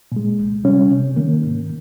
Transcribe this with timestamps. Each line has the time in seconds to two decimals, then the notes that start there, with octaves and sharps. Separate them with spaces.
0.12 A#2 G#3
0.38 C2
0.64 C3 G3 C#4
0.90 C3
1.16 D#3 A#3
1.42 G#2